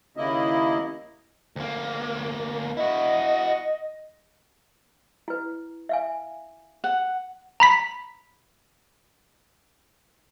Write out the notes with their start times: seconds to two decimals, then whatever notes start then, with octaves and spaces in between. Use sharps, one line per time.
0.17 D#2 C#3 A#3 E4 D#5
1.56 D2 A#3
2.77 E4 F#4 D#5
5.28 E4 B4
5.89 E5 F5 G#5
6.84 F#5
7.60 A#5 B5 B6